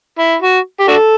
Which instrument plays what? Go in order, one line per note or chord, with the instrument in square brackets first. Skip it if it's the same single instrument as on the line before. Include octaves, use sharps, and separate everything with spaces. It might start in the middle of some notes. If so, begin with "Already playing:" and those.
[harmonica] E4
F#4
G4
D4 F#4 A4